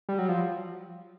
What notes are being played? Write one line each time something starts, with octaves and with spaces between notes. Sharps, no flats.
G3
F#3
F3